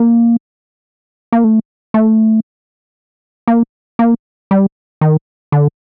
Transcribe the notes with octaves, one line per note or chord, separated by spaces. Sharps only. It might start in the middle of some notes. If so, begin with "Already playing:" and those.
Already playing: A#3
A#3
A3
A3
A#3
A#3
G3
D#3
D3